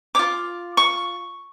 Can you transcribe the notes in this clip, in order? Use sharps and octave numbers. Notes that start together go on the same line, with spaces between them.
F4 C#5 D6
C#6